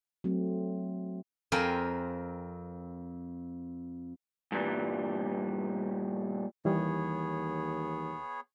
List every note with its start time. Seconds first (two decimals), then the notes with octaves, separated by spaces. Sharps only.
0.24 F#3 A3 C4
1.52 F2 C4 A#4 G5 G#5 C6
4.52 G2 A#2 E3 G3
6.65 D#2 E3 G3 B3 G#4 C#5